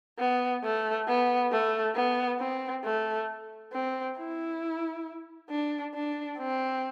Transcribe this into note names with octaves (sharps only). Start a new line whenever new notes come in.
B3
A3
B3
A3
B3
C4
A3
C4
E4
D4
D4
C4